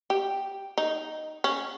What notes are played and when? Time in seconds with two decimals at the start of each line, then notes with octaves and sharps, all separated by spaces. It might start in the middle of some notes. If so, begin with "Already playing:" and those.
0.10 G4
0.78 D#4
1.44 C#4